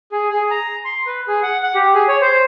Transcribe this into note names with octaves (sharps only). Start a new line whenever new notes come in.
G#4
G#4
A#5
C6
B4
G#4
F#5
F#5
G4
G#4
C#5
C5